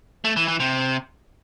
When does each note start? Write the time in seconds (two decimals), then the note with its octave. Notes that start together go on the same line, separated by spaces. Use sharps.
0.25 A3
0.36 E3
0.48 E3
0.60 C3